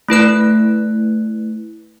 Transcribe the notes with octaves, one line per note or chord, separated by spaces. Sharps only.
A3 E4 B4 F#6